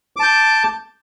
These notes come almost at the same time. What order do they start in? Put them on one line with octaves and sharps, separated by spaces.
D6 A5 G6